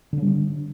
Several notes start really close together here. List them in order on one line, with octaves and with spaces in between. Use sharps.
D3 C#4 G3 D4